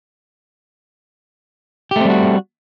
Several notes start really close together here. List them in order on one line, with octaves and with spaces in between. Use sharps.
G4 A3 C4 G3 F#4